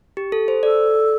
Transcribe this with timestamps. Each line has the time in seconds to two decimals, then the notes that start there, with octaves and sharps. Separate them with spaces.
0.17 G4
0.32 A4
0.48 C5
0.63 A4 D5